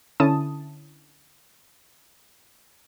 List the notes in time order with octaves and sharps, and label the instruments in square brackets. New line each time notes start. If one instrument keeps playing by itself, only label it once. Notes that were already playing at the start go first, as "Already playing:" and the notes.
[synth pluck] D3 C#4 E4 A5 D#6